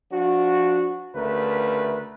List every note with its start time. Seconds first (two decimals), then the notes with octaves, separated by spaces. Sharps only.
0.12 F3 D4 F#4
1.15 D2 C#3 A3 A#4 B4